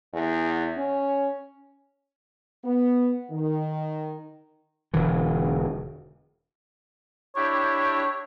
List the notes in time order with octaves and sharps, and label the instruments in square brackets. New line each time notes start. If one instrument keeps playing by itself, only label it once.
[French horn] E2
C#4
[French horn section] B3
D#3
[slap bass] E1 D3 E3
[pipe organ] D4 E4 G4 [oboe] C#5